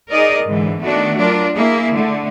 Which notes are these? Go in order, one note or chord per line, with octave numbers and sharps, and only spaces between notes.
D#4 G#4 A#4 D5 D#5
G#2 D3 E3
D#3 A3 B3 D4 F#4
F#3 D4 F4 A#4
A#3 E4 G#4
D3 A3